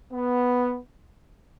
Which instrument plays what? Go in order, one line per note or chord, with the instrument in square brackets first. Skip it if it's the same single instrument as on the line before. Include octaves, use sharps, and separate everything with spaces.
[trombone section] B3